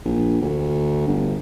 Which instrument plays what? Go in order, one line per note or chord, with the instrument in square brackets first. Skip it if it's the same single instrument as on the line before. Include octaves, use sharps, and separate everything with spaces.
[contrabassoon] A#1
D2
G1